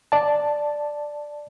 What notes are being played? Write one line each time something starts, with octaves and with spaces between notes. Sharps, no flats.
D5 A5